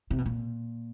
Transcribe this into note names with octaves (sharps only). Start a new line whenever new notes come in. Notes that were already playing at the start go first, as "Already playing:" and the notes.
C3
B2
A#2